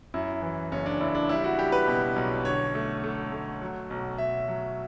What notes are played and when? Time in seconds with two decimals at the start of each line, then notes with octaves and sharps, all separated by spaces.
0.14 F#2 E4
0.42 E3
0.72 F#1 C#4
0.86 D4
1.00 F#1 E4
1.15 D4
1.29 G3 E4
1.44 F#4
1.59 G3 G4
1.72 B4
1.88 B2
2.16 B1
2.45 D3 C#5
2.75 A3
3.04 A3
3.32 A3
3.61 F#3
3.90 B1
4.18 B1 E5
4.48 F#3